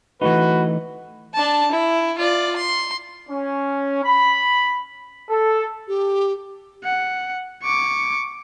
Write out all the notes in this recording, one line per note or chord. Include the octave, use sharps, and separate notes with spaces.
E3 A3 D#4 F#4 B4
D4 A5
E4
F4 D5
C6
C#4
B5
A4
G4
F#5
C#6 D6